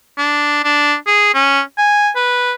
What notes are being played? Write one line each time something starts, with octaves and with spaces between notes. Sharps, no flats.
D4
D4
G#4
C#4
G#5
B4